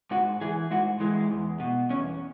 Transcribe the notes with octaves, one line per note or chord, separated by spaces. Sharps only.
G#2 F#4
E3 G#4
G#2 F#4
E3 G#3
E2
B2
E2 C#4